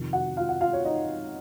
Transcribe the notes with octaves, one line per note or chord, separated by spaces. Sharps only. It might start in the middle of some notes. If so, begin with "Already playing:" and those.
Already playing: F2 C3 D#3
F#4 F#5
F4 F5
F#5
F4 F5
C#5
D#4 D#5